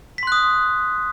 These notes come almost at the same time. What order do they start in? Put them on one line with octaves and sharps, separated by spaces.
B6 C6 F#6 D#6